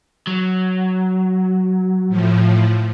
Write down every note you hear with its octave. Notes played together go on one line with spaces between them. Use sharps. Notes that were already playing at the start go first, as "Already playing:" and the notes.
F#3
A2 F3